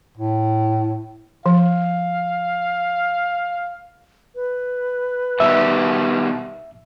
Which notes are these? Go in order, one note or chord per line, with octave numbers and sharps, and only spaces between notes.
A2
F3 F5
B4
B2 D#3 G3 E5